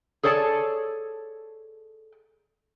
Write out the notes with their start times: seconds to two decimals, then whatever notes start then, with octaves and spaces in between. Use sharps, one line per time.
0.23 G#4 A4 C#5 D5 A5